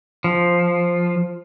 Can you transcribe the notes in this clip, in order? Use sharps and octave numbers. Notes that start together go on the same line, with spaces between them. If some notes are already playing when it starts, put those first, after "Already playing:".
F3